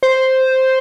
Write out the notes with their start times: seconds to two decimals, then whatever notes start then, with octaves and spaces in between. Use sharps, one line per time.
0.03 C5